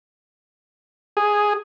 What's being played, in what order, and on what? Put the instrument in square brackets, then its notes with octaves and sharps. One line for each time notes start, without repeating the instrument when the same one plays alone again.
[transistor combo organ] G#4